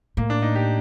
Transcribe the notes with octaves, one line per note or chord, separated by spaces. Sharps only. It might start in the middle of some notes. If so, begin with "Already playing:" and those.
A2 A#3
D4
D#4
G4